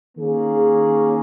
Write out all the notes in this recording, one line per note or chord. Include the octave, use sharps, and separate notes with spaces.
D#3 A#3 C#4 G#4